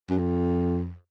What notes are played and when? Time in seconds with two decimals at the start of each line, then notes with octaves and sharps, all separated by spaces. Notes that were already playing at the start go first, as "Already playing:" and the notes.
0.10 F#2
0.18 F2